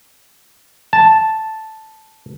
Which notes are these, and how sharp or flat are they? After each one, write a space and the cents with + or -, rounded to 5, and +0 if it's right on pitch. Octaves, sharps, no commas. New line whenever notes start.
A5 -5